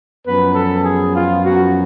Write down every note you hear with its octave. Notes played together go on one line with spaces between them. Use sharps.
F#2 F3 B3 B4
A4
G#4
F4
F#2 F3 B3 F#4